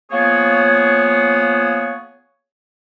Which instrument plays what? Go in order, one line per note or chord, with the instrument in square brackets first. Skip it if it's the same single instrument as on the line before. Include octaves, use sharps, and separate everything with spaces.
[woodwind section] F3 A#3 B3 G#4 C#5